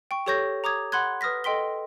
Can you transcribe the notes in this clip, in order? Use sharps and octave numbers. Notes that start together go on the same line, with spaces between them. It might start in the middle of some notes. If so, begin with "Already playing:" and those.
G5 C#6
G4 A4 C#5 C#6 G6 A#6
A#5 D6 D#6 G#6
F#5 B5 C6 F#6 G#6
B4 D#6 F6 A#6 B6
A4 D#5 G5 C6 B6 G7